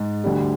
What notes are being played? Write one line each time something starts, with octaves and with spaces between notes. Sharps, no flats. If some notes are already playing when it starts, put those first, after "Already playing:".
Already playing: G#2 G#3
D2 D3 G3